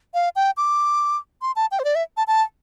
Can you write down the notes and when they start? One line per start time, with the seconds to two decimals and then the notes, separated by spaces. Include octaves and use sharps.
0.14 F5
0.36 G5
0.57 D6
1.42 C6
1.56 A5
1.71 G5
1.79 C5
1.85 D5
1.95 E5
2.17 A5
2.27 A5